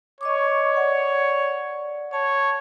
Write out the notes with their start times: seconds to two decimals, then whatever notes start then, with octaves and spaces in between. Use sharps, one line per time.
0.21 C#5 D#5 C#6 D6
0.75 D5 F#5
2.13 C#5 A5